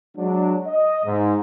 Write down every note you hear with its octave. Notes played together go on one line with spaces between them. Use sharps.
F#3 G#3 D4
D#5
G#2